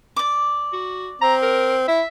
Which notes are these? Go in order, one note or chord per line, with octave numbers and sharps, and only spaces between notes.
D5 D6
F#4
C4 A#5
A#4
E4 E5